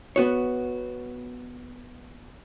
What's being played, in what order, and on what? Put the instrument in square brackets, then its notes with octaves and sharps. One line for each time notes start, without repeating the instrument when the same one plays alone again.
[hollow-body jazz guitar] B3 F#4 C#5